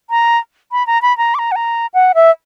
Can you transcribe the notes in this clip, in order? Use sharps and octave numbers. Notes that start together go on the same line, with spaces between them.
A#5
B5
A#5
B5
A#5
D6
A#5
F#5
A#5
F#5
E5